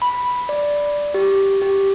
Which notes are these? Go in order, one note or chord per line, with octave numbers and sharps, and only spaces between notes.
B5
D5
G4
G4